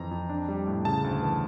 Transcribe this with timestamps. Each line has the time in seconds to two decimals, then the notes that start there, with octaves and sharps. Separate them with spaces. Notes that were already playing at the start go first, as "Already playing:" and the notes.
Already playing: F2 E3 A#5
0.11 F2
0.30 D4
0.49 G3
0.67 A2
0.85 C#3 A5
1.04 D2
1.22 E3